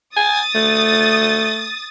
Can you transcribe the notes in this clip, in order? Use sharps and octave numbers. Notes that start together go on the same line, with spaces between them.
G#5 D#6 A6
A3